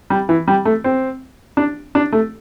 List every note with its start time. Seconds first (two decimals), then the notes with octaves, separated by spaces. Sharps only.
0.10 G3
0.29 E3
0.48 G3
0.65 A3
0.84 C4
1.57 D4
1.95 D4
2.12 A3